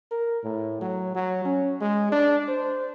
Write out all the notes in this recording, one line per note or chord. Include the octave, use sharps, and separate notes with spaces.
A#4
A2
F#3
F#3
C#4
G#3
D4
C5